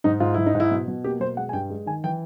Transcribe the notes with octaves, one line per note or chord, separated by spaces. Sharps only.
G#2 D#4
G#2 F4
G#2 E4
D#4
G#2
E4
B2
B2
A#3 G4
B2 C5
G#3 F#5
G#5
G2 G5
G#3
D#3 G#5
E3 G5